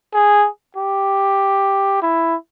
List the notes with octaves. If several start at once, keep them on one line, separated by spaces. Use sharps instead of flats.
G#4
G4
E4